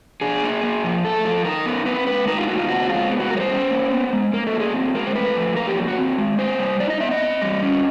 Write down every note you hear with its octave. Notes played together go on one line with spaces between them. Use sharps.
D4 G#4
A#3
A#3
F3
A3 A4
F3
D#4 A#4
B3
C4 B4
G#3 B4
D#4 A#4
F4
A#3 F#4
F4
C4 F#4
G#3 F4
B3
F#4
G3 A#4
C#5
C5
C#4
A#3
B3
G#3
A#3 A#4
A4
F#3
G#4
C4
G#3 A#4
C5
A3 B4
F3
A#3 A#4
G4
F#3
F#4
C4
G#3
A#3 C5
G3
D#4 D5
D#5
B3 E5
D#5
C4
G3
C#4